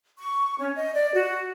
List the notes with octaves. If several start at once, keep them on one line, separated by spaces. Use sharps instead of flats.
C#6
C#4
D#5
D5
F#4